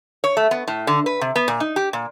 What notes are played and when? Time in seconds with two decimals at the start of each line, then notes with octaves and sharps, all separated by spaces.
0.24 C#5
0.37 A3
0.51 B3
0.68 A2
0.87 D3
1.06 B4
1.21 C3
1.36 B3
1.48 A#2
1.60 D#4
1.76 G4
1.93 A#2